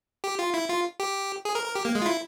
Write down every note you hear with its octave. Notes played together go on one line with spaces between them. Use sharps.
G4
F4
E4
F4
G4
G#4
A#4
A#4
G4
A#3
G#3
F4
E4